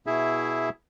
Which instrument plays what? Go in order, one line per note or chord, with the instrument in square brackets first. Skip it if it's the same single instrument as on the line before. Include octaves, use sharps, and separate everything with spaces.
[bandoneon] B2 E4 G#4 E5